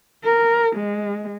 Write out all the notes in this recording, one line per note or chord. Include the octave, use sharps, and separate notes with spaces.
A#4
G#3